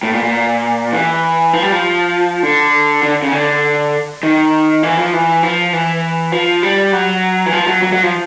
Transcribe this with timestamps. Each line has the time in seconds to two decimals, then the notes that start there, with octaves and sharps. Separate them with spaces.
0.03 A2
0.13 A#2
0.23 A#2
0.92 E3
1.53 F3
1.63 G3
1.72 F3
2.43 D3
3.03 D3
3.23 C#3
3.32 D3
4.23 D#3
4.83 E3
4.97 F3
5.13 E3
5.43 F3
5.73 E3
6.32 F3
6.63 G3
6.93 F#3
7.46 E3
7.53 F3
7.67 F#3
7.82 F#3
7.93 F#3
8.03 F3